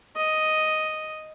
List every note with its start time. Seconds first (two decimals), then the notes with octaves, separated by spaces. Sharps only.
0.16 D#5